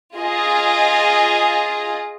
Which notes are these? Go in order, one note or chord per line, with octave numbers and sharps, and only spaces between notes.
F4 G#4 D#5